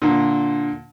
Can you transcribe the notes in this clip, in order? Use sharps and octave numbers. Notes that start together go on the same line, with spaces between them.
A#2 D3